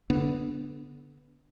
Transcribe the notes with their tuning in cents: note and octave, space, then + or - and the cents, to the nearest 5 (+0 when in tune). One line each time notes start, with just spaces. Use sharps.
D3 -25 B3 -5 D4 +5